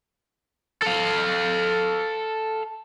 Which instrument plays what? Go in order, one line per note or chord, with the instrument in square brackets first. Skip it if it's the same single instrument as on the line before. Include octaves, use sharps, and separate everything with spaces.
[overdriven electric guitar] A4 F5